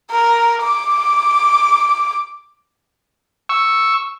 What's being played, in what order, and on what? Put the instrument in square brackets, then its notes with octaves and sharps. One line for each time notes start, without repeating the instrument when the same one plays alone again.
[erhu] A#4
D6
[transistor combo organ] C#6 E6